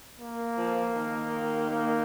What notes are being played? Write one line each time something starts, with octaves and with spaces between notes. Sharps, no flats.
A#3
F3
D#3
A#3